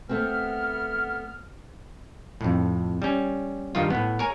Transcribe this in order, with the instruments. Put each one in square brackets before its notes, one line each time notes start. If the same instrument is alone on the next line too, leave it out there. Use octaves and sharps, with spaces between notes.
[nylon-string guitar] A3 C4 [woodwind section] B3 F6
[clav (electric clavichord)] F2 A2
G3 C#4
G2 D#3 G3 F4
A2 B3
A#4 C#5 G#5